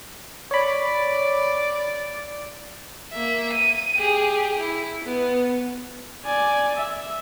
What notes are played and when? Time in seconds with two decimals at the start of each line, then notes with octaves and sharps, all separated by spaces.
0.51 C#5 D5 B5
3.13 A#3 E5
3.53 D#7
3.97 G4 G#4
4.58 E4
5.05 B3
6.25 D5 G#5
6.77 E5